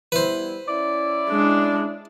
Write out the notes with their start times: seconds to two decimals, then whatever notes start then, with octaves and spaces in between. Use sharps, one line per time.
0.12 G3 B3 E4 B4 C5
0.68 C#4 E4 D5
1.30 G#3 D4